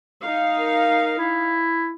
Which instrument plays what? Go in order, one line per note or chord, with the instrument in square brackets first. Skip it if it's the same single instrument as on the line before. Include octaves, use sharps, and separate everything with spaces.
[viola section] D#4 F5
[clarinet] A#4
E4